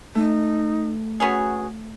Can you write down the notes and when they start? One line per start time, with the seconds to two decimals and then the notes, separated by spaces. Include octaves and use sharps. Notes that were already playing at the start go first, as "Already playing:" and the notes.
0.15 A3 D#4
1.20 B3 C#4 F#4 G#4